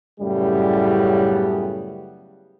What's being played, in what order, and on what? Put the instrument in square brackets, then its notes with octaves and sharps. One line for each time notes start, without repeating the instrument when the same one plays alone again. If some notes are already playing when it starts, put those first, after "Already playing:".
[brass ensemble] F#2 A2 C#3 G3 B3